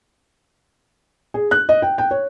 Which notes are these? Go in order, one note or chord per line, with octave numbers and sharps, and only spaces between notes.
G#4
F#6
D#5
G5
G5
C#5